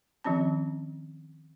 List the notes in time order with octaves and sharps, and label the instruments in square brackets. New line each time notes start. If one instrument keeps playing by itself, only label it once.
[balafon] D#3 F3 C4 C#4 A5